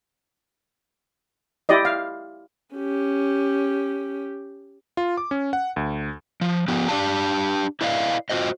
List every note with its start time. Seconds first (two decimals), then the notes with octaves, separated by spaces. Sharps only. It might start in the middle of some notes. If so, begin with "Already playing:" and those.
1.69 E4 G4 D5 D#5
1.85 F5
2.75 C#4 G4
4.97 F4
5.17 D6
5.31 C#4
5.53 F#5
5.76 D2
6.41 F3
6.68 F3 B3 G4
6.89 D4 G4 D5 F5 A5
7.81 E4 B4 D5 D#5 F5
8.30 F4 F#4 C5 D#5